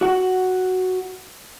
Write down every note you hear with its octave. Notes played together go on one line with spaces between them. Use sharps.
F#4 F#5